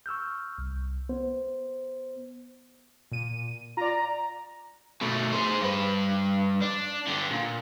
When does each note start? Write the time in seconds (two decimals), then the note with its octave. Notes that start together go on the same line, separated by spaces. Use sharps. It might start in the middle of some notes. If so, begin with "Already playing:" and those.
0.06 C#6 E6 F6 G6
0.58 C2
1.09 B3 C5
3.11 A#2 D#7
3.77 F4 D5 A#5
5.01 B2 A3
5.33 G#4 C5
5.61 G2 B4
6.62 D4
7.07 D3 G3
7.31 A#2